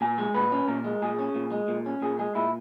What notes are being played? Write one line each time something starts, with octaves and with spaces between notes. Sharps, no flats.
A#2 G#5
G#3
A#2 B4
C#4
A#2 A#4
G#3
A#2 G#4
C#4
A#2
G#3
A#2
C#4
A#2 G#4
G#3 G#4
A#2 E4